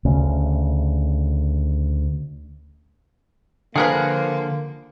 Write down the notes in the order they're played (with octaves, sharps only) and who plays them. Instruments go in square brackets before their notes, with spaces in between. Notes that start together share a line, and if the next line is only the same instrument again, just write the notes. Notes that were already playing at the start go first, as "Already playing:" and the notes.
[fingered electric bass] D2 C#3
[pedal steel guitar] D3 [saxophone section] F3 A#3 [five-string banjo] G#4 A#4 B4